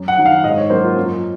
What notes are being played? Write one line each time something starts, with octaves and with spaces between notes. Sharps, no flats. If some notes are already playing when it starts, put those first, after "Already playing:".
Already playing: F#2
F#5
D#3 F#3
F5
G#2 D#5
C#5
F#3 A#3 C#4 C5
F4
F#2 F4